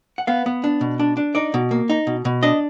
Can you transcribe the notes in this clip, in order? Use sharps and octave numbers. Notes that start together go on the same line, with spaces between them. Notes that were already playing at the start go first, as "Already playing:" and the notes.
F#5
B3 F5
B3
D4
B2
D4
D4
D#4 D5
B2
A#3
D#4
B2
B2
D4 D#5